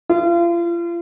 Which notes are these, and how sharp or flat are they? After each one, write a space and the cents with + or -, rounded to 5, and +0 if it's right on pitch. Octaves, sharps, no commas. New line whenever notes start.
F4 -35